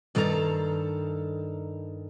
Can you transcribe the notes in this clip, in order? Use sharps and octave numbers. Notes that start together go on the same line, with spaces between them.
G2 D#3 A4 F5 A#5